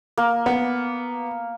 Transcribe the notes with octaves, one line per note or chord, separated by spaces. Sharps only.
A#3
B3